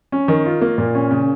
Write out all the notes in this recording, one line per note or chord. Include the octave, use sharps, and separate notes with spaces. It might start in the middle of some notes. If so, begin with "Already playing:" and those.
C#4
D#3
F4
A#3
A#2
C#4
C#3